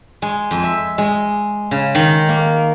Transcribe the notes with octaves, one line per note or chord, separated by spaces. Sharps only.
G#3
F2
E5
G#3
C#3
D#3
A#3